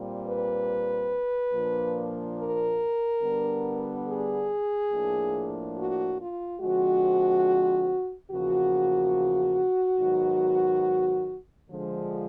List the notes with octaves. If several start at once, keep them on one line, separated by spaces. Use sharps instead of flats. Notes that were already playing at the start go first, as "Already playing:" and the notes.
Already playing: A#2 G3 C4
B4
A#2 F3 A#3 D4
A#4
D3 G3 B3 D4
G#4
A2 F3 A#3 D4
F#4
F4
D3 F3 G#3 C4 F#4
E2 C#3 F3 A#3 F#4
G#2 D#3 F#3 B3
D3 F3 G#3